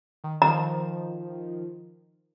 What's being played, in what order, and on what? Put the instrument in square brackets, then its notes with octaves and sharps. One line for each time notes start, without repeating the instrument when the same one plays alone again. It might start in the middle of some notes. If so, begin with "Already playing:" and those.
[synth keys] D#3
[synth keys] D#3 F3 [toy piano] A#5